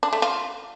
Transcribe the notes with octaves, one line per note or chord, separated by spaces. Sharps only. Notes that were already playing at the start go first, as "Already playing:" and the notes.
D4
A3
F4